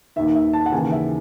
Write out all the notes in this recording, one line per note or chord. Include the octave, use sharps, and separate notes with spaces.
D#2 D#3 E5
E5
A5
F#5
D#2 C#3 E3 G#5
E5